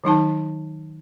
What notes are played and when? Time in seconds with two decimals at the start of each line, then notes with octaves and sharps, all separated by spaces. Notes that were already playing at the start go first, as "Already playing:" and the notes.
0.04 D#3 F#3 D#4 A5